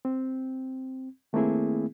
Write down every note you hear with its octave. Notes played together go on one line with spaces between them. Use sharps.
C4
D#3 A3 A#3 C4 E4 G#4